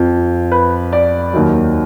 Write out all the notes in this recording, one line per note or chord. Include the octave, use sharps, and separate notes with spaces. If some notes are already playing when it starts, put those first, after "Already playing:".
Already playing: F2 F3
B4
D5
D#2 D#3 F#3